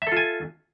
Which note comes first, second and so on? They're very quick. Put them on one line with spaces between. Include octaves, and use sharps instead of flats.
E5 A4 F4 G#5